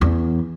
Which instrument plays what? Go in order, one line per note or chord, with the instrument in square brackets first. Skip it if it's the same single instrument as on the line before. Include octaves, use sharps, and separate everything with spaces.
[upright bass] E2